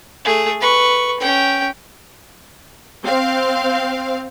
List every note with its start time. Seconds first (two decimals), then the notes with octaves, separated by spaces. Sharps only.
0.25 A3 G#4
0.60 B4 C#6
1.20 C#4 G5
3.04 C4 F5